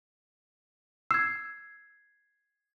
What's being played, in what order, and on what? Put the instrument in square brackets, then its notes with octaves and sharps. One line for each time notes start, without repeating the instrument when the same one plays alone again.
[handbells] E6 [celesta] G#6 C7